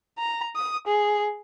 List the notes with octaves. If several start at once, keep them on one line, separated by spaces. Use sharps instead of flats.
A#5
D#6
G#4